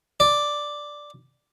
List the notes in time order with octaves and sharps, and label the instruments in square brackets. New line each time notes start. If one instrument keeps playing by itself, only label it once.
[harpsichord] D5